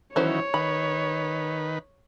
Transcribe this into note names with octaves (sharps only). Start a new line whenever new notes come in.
D#3 E3 F#3 C#4 E4 C5 C#5
D#3 B4 B5